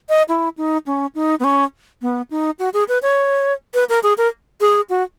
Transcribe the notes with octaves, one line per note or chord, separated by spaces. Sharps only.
D#5
E4
D#4
C#4
D#4
B3
C#4
B3
D#4
F#4
G#4
B4
C#5
B4
A#4
G#4
A#4
G#4
F#4